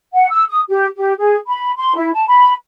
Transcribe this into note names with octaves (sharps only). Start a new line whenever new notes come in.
F#5
E6
D#6
G4
G4
G#4
B5
C6
E4
A5
B5